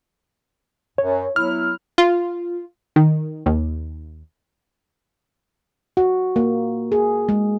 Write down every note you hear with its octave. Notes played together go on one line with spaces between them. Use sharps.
F#2 C#5
F#3 B3 E4 F6
F4
D#3
D#2
F#4
A#3
G#4
G#3